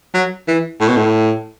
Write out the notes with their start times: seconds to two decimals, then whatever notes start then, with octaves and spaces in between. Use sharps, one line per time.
0.14 F#3
0.48 E3
0.80 A2
0.88 B2
0.97 A2